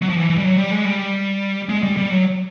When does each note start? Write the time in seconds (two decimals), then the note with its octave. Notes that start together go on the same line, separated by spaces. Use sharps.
0.02 F#3
0.09 F3
0.15 E3
0.30 E3
0.38 G3
0.44 F#3
0.57 G3
0.71 G#3
0.84 G3
1.69 G#3
1.83 G3
1.97 G3
2.10 F#3